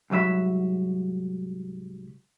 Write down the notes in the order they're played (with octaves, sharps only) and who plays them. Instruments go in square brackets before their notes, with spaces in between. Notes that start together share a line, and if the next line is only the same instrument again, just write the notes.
[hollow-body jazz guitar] C2 G#2 F#3 E5 B5